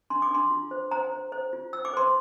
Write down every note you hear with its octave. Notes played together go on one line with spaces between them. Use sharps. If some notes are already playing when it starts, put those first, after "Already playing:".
D4 C6
D6
D4 C6
F4
C5
C5 A#5
C5
C5
F4
C5 E6
D6
C5 C6